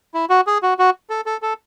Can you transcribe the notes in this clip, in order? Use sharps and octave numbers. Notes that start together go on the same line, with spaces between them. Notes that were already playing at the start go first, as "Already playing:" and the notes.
E4
F#4
G#4
F#4
F#4
A4
A4
A4